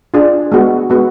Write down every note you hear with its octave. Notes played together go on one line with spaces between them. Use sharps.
D4 F4 G#4
G#3 B3 F#4
G#3 B3 F#4